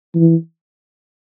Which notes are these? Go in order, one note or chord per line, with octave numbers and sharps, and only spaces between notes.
E3